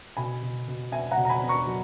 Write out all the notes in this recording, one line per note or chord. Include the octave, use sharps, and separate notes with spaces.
B2 G#5 B5
B2
B2
B3 E5 G#5
F#5 A#5
B2
A#5
G#5 B5
B3
A#5 C#6
F#3